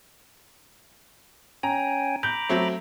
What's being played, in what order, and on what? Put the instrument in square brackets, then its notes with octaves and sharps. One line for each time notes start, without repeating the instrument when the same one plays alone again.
[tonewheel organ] C#4 G5 G#5 [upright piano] A#5
[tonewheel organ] A#5 B5 D6 [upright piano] G6
[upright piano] F#3 A3 C4